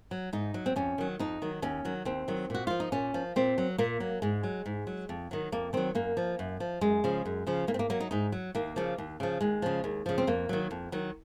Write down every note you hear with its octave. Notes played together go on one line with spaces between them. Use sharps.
F#3
G#2 D#4
F#3
C4
F2 C#4
D#3 F#3
F2 D#4
D#3 F#3
D#2 C#4
D#3 F#3
D#2 C4
D#3 F#3
A#2 F#4
F3 F4
D#4
A#2 C#4
F3
A#2 C4
F#3
A#2 A#3
F#3
G#2 G#3
F#3
G#2
F#3
F2
D#3 F#3
F2 A#3
D#3 F#3 C4
F#2 A#3
F3
F#2
F3
F#2 G#3
C#3 F3
F#2
C#3 F3
G#2 A#3
C4
A#3
F#3 A#3
D#4
G#2 D#4
F#3
D#2 A#3
C#3 F3
D#2
C#3 F3
D#2 G#3
C#3 F3
D#2
C#3 F3
C4
F2 A#3
D#3 F#3
F2
D#3 F#3